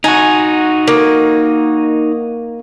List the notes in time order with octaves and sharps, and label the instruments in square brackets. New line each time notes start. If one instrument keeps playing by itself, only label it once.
[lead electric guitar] D#4 F#4 [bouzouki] G#5
[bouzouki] A#3